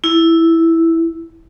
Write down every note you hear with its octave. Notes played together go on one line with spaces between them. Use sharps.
E4